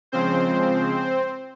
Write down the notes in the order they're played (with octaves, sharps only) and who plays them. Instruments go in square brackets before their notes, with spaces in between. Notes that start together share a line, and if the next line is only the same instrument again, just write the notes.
[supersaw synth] C#3 F3 G#3 C4 C5